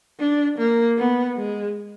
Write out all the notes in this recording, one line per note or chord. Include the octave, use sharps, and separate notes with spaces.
D4
A#3
B3
G#3